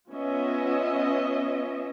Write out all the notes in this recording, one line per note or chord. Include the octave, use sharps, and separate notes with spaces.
B3 C#4 F4 D#5 E5